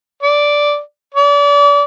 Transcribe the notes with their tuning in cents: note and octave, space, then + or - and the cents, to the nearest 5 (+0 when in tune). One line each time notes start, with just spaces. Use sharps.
D5 -5
D5 -35